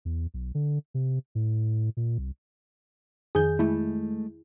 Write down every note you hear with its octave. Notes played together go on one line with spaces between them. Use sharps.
E2
B1
D3
C3
A2
A#2
C2
F2 D#3 G#4 G6
G#3 A3 E4